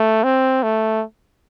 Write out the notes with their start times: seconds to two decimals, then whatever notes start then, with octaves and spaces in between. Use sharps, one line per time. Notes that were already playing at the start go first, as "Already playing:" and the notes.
Already playing: A3
0.23 C4
0.63 A3